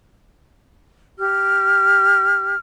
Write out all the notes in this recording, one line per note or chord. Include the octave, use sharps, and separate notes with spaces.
G4 F6